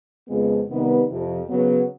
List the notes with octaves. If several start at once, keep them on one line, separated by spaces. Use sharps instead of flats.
F2 C#3 F3 G#3 B3
C3 D#3 G3 B3 D#4
F2 C3 F3
C#3 F#3 B3